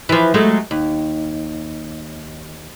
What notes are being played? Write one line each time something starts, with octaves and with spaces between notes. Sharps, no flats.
E3 F3
F#3 G#3 A3
D#2